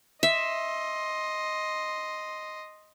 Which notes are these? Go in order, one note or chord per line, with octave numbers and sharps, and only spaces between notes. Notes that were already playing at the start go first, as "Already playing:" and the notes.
D#5 E5 C6